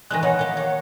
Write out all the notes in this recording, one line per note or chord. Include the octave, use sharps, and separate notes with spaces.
D#3 E3 G#3 G#5 F#6 A#6
B2 F#3 D#4 F#5
A#3 G4
A#3 C#5